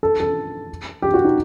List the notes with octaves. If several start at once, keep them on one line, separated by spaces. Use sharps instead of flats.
A4
A4
G4
F#4
D#4